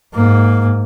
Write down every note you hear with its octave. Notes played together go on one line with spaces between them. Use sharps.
G#2 A#3